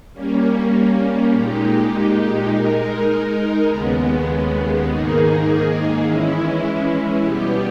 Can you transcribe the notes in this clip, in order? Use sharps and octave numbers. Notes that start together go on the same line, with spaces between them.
G3 A#3 C#4
A#2 G#3 D#4 G4
G#3 D#4 A#4
D#2 C#3 G#3 B3
G#2 D#3 A#3 D#4 G#4
E3 G#3 C#4 E4
B2 G3 B3 G4